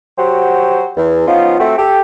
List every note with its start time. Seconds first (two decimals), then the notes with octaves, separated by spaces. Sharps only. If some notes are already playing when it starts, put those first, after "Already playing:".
0.18 F#3 F#4 G4 C5
0.97 E2
1.27 F3 B3 C#4 D#4 F4
1.60 A3 C4 F#4
1.78 G4 A4